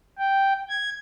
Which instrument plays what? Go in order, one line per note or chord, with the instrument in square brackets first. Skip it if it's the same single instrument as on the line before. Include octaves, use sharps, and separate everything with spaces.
[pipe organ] G5
G#6